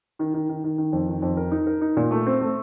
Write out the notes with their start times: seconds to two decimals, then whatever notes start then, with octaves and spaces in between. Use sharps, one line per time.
0.19 D#3
0.34 D#3
0.49 D#3
0.64 D#3
0.78 D#3
0.93 F2
1.08 D#3
1.22 F2
1.37 A#4
1.52 D#4
1.67 A#4
1.81 D#4
1.97 A#2
2.11 A3
2.27 C4
2.41 A3